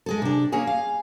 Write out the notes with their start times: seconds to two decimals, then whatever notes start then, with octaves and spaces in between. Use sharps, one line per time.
0.06 G#3 G#4 A4
0.22 C3 D4
0.52 A#3 C#4 G#4 G#5
0.67 F5